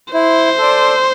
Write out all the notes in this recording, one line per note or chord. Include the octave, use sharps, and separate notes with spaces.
E4 C5
A4 D5